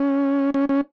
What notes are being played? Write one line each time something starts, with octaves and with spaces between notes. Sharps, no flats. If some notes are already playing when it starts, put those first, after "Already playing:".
Already playing: C#4
C#4
C#4